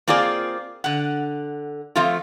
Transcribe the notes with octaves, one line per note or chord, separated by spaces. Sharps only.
A#3 C4 F4 G#4 D5
D3 F#5
F3 A3 C4 F4